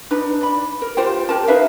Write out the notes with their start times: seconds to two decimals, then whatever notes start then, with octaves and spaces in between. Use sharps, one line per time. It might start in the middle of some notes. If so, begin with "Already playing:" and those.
0.11 D4 D#4 B4
0.41 D5 B5
0.82 A#4
0.97 F4 G4 C5 G5
1.29 G4 A#4 A5
1.48 D#4 B4 E5 F5